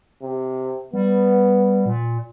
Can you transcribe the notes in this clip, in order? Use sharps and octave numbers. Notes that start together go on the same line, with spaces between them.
C3
G3 B3
A#2